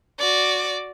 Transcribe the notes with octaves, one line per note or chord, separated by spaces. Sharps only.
F#4 D5